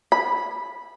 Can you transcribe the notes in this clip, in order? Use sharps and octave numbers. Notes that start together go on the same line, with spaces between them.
B5